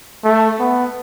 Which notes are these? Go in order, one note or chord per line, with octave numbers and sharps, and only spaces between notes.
A3
B3